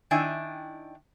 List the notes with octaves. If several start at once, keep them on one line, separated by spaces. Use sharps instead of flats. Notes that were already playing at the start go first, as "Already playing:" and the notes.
D#3 D4 E4 G5 G#5